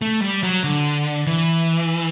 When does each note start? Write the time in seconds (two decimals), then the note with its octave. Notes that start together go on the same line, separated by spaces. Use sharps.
0.02 A3
0.22 G3
0.43 F#3
0.64 D3
1.27 E3